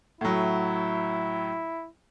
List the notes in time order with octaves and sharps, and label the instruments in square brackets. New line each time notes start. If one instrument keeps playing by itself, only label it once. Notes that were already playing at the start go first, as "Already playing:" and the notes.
[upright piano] A2 F#3 [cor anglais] E4